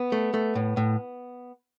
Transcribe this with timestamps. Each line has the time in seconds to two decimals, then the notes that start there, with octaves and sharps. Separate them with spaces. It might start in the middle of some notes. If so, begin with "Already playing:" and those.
Already playing: B3
0.12 A3
0.34 A3
0.55 A2
0.77 A2